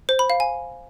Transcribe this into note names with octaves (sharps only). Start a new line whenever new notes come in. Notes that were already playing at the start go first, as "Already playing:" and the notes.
C5
B5
F5
G#5